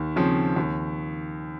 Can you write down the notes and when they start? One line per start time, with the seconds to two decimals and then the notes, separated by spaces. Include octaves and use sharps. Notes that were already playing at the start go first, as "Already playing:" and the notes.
Already playing: D#2
0.16 C#3 F3 C4
0.56 D#2